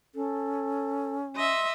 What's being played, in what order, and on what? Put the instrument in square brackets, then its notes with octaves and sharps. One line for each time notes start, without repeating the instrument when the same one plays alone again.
[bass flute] C#4 [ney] A4
[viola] D#5 E5 [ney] C6